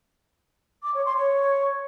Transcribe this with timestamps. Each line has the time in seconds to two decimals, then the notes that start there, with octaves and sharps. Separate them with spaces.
0.82 D6
0.94 C#5
1.05 C6
1.16 C#5